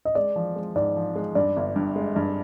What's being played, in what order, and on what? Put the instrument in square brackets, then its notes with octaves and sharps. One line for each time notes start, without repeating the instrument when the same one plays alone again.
[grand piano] D#5
[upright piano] G#3 [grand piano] D5
[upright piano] F3
G#3
[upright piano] G#2 [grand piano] D5
[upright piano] F3
G#3
[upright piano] G2 [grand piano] D5
[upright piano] G1
G2
G#3
G2